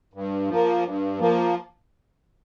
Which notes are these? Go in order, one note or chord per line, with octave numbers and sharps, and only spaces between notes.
G2
F3 A#3
G2
F3 A#3